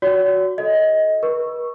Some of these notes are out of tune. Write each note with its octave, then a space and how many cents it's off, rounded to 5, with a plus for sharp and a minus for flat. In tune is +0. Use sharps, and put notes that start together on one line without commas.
F#4 +0 C#5 +45
A4 +0 D#5 +20
B4 -40 C#6 +0